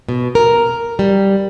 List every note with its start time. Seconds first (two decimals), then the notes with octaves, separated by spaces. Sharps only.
0.09 B2
0.35 A#4
0.99 G3